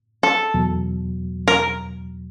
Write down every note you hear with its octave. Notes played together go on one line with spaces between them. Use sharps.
A4
E2 B2 F#3
A#4